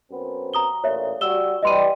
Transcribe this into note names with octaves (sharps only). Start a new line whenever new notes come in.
F#2 B3 C4
A#5 D#6 G7
A1 A#2 C#5 E5
G3 F#4 E6 E7 G7
E3 G3 D#5 C6 D#7